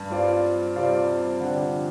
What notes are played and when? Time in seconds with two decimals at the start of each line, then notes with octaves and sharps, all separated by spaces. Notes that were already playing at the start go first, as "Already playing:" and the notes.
Already playing: G2
0.10 G3 C4 F4 D5 F5
0.76 C3 G3 C4 F4 D5 F5
1.40 D3 F3 D4 G4 C5